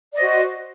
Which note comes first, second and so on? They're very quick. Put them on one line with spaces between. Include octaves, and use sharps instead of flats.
D5 D#5 C5 F#4